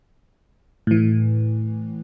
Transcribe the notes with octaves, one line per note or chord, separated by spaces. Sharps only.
A2 E3